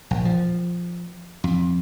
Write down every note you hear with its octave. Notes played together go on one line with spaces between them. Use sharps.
A#1
F3
F2